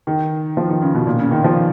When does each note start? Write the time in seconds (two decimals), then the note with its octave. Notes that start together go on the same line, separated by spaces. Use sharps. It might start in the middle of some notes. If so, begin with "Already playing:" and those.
0.07 D#3
0.57 F3
0.69 D#3
0.82 C#3
0.94 B2
1.07 A#2
1.19 C#3
1.31 D#3
1.44 F3